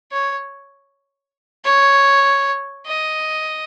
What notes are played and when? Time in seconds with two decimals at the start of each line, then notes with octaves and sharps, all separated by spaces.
0.12 C#5
1.65 C#5
2.86 D#5